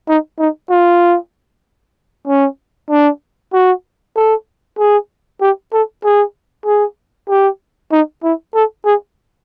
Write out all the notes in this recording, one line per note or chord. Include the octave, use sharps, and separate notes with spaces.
D#4
D#4
F4
C#4
D4
F#4
A4
G#4
G4
A4
G#4
G#4
G4
D#4
E4
A4
G#4